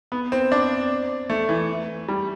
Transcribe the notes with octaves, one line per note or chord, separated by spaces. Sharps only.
B3
C4
D4
A3
E3
G3